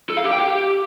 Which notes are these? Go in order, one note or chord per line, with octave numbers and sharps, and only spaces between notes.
A4
F5
G4
G5
G4